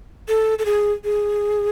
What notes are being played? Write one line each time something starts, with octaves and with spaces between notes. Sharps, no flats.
A4
A4
G#4
G#4